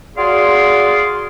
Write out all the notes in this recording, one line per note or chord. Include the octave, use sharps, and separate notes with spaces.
F#4 G#4 D5 F5 C6